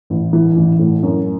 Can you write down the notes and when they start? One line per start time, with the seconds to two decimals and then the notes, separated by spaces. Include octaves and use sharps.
0.10 A1
0.33 E3
0.56 A1
0.79 A2
1.03 F#2